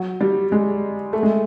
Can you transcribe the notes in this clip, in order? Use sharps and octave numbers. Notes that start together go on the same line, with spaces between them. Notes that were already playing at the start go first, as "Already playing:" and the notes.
Already playing: F#3
G3
G#3
A3
G#3